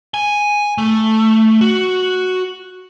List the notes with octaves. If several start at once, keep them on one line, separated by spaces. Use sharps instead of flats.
G#5
A3
F#4